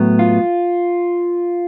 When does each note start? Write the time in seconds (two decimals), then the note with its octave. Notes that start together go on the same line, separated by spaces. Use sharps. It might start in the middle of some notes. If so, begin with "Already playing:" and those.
Already playing: A2 F#3 B3
0.19 F4